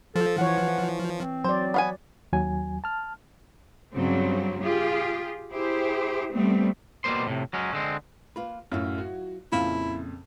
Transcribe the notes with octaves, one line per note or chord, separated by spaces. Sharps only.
F3 A4
E3 C#5 F#5
C4
F#3 C5 D5
B3 F5 G#5
D#2 F#3 G#5
A5 F6
G2 C#3 F#3 G3 C4
F4 G4 G#4
E4 G4 G#4 C5
G3 A3 B3 C4
B2 G3 A#3 C5 C6
A2 C3
F#3 G#3 C#4
D3 G#3 C4
A#3 F4 B4
F#2 A2 F#3 E4 F4
F#4
F2 A#2 C#3 E4 F4 F5